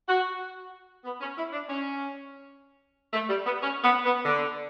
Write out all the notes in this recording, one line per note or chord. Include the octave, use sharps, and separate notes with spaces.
F#4
B3
C#4
E4
D4
C#4
A3
G3
B3
C#4
B3
B3
D3